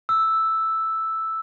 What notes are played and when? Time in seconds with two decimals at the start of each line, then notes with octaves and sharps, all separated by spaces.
0.09 E6